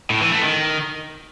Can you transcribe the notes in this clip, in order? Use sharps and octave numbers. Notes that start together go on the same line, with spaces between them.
A2
E3
A3
D#3